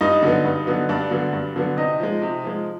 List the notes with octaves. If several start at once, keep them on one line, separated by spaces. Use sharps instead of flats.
G2 D#4 D#5
D3 F#3 B3
G2
D3 F#3 B3
G2 D4 D5
D3 F#3 B3
G2
D3 F#3 B3
C3 D#4 D#5
F3 G#3
C3
F3 G#3